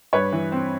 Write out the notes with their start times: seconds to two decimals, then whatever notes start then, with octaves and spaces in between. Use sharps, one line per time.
0.13 G2 B4 C#5
0.32 E3
0.52 C4